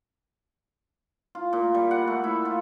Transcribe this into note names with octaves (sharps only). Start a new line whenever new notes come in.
F4
A#2
G3
F#5
A3
E4
F4